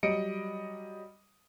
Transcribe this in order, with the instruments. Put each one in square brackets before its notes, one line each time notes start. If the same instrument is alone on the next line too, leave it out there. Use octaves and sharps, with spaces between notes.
[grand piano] F#3 G3 D#5 C#7 D7